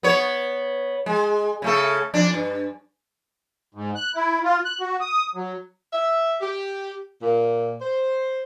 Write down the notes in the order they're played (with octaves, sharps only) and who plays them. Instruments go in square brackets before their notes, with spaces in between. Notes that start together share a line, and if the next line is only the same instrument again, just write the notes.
[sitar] B3 C#5
G#3
C#3 A3 A4
F2 D4
G2
[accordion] G#2
F#6
E4
F4
F#6
F#4
D#6
F#3
[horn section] E5
G4
A#2
C5